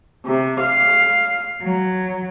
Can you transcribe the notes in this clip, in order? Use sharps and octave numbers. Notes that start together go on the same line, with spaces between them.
C3
F5
F#3